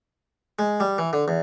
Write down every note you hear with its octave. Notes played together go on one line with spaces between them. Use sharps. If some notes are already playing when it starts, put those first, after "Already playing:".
G#3
G3
E3
D3
E2